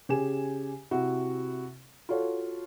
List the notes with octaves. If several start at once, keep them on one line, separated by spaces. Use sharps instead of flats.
C#3 G4 G#4 G#5 E7
C3 E4 F#4
F4 F#4 A4 C#5